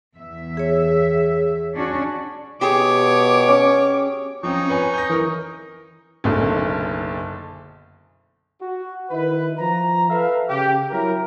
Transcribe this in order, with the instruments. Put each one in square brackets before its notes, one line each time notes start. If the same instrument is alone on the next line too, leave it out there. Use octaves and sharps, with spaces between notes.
[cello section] E2 E5
[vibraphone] G#4 C#5
[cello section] C#4 D4 F#4
[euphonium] B2 [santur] G4 G#4 [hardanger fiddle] C#5 [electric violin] D6
[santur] C#4
[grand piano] F3 C4 C#4 [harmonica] D#4 C#6
[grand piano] B4 C#5 G#5
G6 A#6
E3 A#4
[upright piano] F#1 B1 D3
[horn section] F#4
D#3 E4 B4
F3 A#5
A4 B4 E5 F5
C#3 G4
F#3 E4 A#4